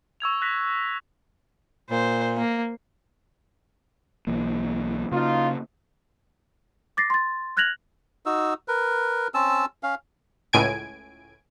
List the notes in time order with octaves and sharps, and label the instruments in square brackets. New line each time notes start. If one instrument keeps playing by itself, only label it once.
[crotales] C#6 E6 G#6 F7
F#6 A#6 B6 F7
[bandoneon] A#2 [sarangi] C5
[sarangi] A#3
[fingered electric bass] B1 E3 A#3
[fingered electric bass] C#3 A#3 [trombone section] D#4 F4
[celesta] D6 A6 A#6 C7
C6 A6
F6 F#6 G#6 A#6 F7 F#7
[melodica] D#4 F#4 E6
A#4 B4
C4 C#4 A5 E6
C#4 F5
[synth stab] C#2 A2 G#5 G#6 D7